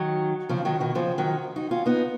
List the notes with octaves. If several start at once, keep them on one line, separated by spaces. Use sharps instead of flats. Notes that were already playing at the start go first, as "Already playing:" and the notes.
Already playing: D#3 F#3
C#3 F3
D#3 F#3
B2 D#3
C#3 F3
D#3 F#3
D#4 F#4
C#4 F4
B3 D#4